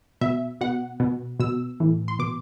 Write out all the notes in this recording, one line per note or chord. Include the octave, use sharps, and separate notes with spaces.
B2 E5
B2 F#5
B2
B2 E6
A2 E3
C6
B2 D6